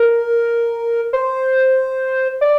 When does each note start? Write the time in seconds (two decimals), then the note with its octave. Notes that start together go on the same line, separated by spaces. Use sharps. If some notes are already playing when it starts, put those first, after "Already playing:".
Already playing: A#4
1.13 C5
2.41 D5